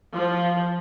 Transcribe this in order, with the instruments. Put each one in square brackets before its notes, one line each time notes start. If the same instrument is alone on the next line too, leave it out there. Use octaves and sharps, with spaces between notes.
[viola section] F3